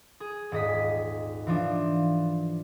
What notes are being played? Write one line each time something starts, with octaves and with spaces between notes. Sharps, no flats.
G#4
D#1 G#2 D#5 B6
E3 F3 D4